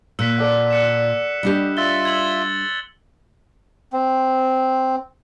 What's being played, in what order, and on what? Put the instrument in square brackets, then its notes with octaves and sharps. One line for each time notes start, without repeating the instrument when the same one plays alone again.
[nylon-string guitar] A#2 [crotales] E6 F#6 B6
[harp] A4 D5 F#5
[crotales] F#6 C#7 E7
[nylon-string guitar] G3 D4 G4 [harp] D#5
[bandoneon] F4 E5 [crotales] E6 A6 G7
[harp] C6 E6 [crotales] G#6 F#7
[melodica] C4